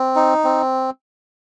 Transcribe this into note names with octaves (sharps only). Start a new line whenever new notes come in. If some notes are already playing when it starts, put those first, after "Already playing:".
Already playing: C4
D#4
C4